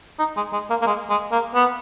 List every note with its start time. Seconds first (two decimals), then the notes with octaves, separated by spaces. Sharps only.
0.19 D#4
0.37 G#3
0.53 G#3
0.70 A#3
0.82 A#3
0.86 G#3
1.10 G#3
1.32 A#3
1.54 B3